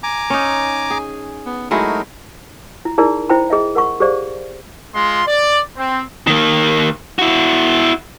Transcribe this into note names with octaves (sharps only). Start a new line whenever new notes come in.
G#5 A#5 D6
C#4 D#4
G#4
B3
F#3 G#3 A3 D#4 E4 A#4
E4
D#4 E4 G#4 A#4 D5
E4 C5 G5 B5
G#4 D#5 E5
A#4 F#5 B5 C#6
G4 G#4 C5 D5 F5
G#3 F4 C6
D5
C4
D#3 A#3
E4 F#4